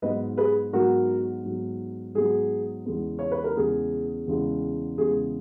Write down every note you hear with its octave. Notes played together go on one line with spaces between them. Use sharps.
G#2 F#3 B3 B4 D#5
G#4 B4
G#2 F#3 B3 F#4 A#4
G#2 F#3 B3
G#2 F#3 B3 G#4
E2 C#3 G#3 B3
C#5
B4
A#4
E2 C#3 G#3 B3 G#4
E2 C#3 G#3 B3
E2 C#3 G#3 B3 G#4